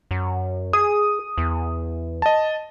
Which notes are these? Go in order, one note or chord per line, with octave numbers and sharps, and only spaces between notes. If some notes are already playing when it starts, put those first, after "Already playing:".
F#2
G#4 D#6
E2
D#5 A5